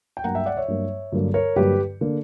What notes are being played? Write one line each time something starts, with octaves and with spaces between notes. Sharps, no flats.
G5
G2 F#3 A#3 F#5 A#5
E5 G5
D5 F#5
C#5 E5
G2 F#3 A#3
G2 D3 F#3 A#3
A#4 C#5
G2 D3 F#3 A#3 G4 B4
D3 A#3